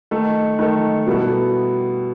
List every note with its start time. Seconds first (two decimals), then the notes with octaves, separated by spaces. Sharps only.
0.11 D#3 A3 D#4 A4
0.59 D#3 A3 D#4 A4
1.07 B2 G3 B3 E4 A4